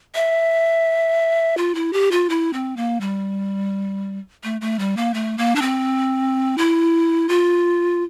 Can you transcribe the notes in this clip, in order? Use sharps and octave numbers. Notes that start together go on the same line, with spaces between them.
E5
F4
E4
G4
F4
E4
C4
A#3
G3
A3
A3
G3
A#3
A3
A#3
D4
C4
E4
F4